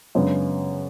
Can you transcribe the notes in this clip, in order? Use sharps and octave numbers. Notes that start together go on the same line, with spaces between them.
F#2 C#3 G#3 B3 D4